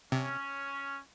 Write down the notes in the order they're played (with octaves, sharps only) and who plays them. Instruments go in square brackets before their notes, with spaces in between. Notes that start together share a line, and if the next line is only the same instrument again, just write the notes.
[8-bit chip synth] C3 [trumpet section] C#4